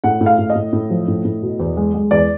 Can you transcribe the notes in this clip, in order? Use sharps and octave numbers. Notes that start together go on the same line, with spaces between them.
A2 F#5
A2
F5
A2
D#5
A2
A2
F3
A2
A2
B2
E2
G#3
G#3
E2 D5